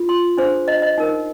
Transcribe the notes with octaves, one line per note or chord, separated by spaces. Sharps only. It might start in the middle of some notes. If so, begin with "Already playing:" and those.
Already playing: F4
C6
D4 G#4 C5
D#5
D#5
D#4 A#4